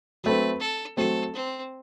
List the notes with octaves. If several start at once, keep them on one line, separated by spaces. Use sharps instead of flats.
F#3 A3 C4 B4
A4
F#3 A3 C4 A4
C4